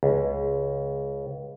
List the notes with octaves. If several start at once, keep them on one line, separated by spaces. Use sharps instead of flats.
C#2